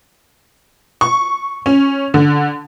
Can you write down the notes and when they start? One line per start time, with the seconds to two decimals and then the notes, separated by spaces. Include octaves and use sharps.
1.01 C#6
1.66 C#4
2.14 D3